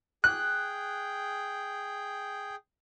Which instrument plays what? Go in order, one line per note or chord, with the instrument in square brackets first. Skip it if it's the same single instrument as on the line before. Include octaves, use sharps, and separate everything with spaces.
[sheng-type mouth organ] G#4 G5 [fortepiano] F#6